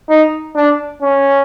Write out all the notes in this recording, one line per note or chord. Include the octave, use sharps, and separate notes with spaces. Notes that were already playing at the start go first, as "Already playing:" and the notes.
D#4
D4
C#4